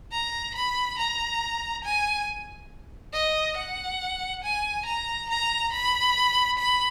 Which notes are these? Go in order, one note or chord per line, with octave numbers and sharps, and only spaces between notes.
A#5
B5
A#5
G#5
D#5
F#5
G#5
A#5
A#5
B5
B5